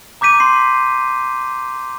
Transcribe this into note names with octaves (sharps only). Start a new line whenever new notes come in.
A#5 D6 G6 B6 D#7
C6 C7